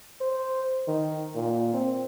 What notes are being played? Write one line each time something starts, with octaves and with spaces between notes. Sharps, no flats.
C5
D#3
A#2
C4